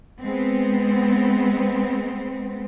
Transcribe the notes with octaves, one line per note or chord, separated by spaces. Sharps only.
G#3 B3 C4